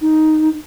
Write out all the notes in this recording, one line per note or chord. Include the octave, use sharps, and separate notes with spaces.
D#4